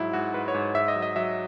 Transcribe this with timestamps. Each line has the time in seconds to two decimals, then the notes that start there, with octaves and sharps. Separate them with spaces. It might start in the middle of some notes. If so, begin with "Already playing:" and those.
Already playing: G#2 F#3 E4
0.13 G#2 F#4
0.34 G#2 B4
0.48 C#5
0.54 G#2
0.75 G#2 E5
0.88 D#5
0.96 F#3
1.02 D#5
1.16 F#3 E5